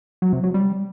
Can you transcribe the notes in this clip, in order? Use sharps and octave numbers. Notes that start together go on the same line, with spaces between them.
F#3
C3
F#3
G3